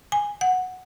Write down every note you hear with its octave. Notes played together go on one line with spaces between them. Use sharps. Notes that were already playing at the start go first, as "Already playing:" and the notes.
G#5
F#5